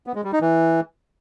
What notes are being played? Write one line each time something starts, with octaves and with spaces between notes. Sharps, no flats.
B3
G#3
G3
D#4
E3